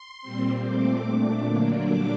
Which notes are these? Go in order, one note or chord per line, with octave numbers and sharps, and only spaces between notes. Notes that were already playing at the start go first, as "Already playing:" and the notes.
Already playing: C6
A#2 G3 C4
A#2 A3 C4 D6
A#2 A3 D4
D3 F#3 A#3 D4
A#2 G3 D4 D6